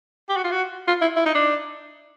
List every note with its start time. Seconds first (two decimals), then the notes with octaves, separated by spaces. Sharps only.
0.29 G4
0.37 F#4
0.44 F4
0.51 F#4
0.88 F4
1.02 E4
1.17 E4
1.26 D#4
1.35 D4